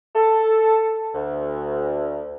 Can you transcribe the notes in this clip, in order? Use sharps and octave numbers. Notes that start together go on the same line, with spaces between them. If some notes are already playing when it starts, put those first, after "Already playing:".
A4
D2